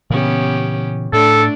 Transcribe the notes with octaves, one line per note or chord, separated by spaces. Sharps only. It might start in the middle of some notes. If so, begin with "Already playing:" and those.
A#2 C#3 E3 B3 C#4 G4
A2 A3 D4 A4